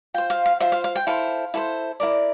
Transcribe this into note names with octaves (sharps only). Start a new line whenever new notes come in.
F4 C5 G5
F5
F5
F4 C5 E5
F5
F5
G5
E4 A4 C5 F5
E4 A4 C5
E4 A#4 D5